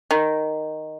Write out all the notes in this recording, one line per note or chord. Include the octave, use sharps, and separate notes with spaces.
D#3